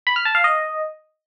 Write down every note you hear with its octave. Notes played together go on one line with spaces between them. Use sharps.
B5
F6
A5
F5
D#5